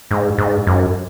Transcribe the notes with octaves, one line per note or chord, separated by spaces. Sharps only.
G#2
G#2
F#2